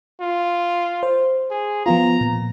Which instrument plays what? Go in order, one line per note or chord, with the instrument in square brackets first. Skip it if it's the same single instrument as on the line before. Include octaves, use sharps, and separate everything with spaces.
[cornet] F4
[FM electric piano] C5
[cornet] G#4
[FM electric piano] F3 B3 F4 [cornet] A#5
[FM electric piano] A#2